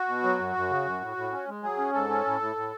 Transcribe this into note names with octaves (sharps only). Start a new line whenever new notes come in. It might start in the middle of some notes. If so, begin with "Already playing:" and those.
Already playing: F#4
B2
F#3
F#2
F#2
C#3
F#2
A2
A2
C#4
G#3
F#3 G#4
C#4
G#2 A4
C#4
A2
A2
A2